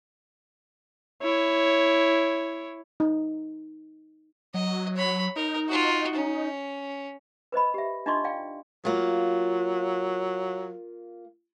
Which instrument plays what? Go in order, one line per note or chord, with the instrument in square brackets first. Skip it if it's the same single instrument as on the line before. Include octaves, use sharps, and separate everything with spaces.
[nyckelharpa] E4 C#5
[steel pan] D#4
[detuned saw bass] F#3 [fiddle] D#5
[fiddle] C#5 B5
[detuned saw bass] D#4 [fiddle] A#4
[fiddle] F4 F#4
C#4
[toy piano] B4 C5 D#5 B5
G4 E5
D4 D#4 F4 D#5 C6 C#6
D5 F5 G5
[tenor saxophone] F#3 [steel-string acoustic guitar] A#3 F4